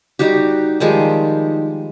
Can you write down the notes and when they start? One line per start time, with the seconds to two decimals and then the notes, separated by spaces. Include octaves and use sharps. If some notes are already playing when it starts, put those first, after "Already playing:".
0.19 G3 D#4 F#4 G4
0.80 D#3 F3 G3 G#3